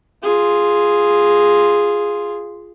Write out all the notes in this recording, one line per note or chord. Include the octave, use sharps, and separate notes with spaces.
F4 G#4